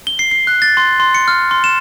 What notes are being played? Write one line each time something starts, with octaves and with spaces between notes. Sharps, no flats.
G7
C7
C7
F#6
A6
C6
C6
C#7
F6
C6
E7